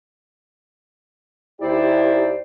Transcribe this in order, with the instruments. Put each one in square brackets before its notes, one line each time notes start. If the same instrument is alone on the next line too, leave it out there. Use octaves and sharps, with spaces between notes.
[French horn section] D#2 E4 G4 [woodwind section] C5 D5